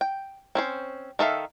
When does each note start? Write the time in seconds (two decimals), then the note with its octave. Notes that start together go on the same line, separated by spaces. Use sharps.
0.01 G5
0.55 C4 C#4 C5
1.19 D#3 A4 E5 F5